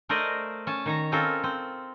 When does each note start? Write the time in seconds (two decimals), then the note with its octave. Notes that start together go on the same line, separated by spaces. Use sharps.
0.09 A3 A#4 C5 D5 D#5
0.67 C#4 A5
0.86 D#3 C#5 A#5
1.12 C4 C#4 F4 A4 A#4
1.44 C4